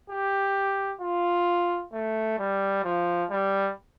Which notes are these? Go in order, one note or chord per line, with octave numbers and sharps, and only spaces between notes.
G4
F4
A3
G3
F3
G3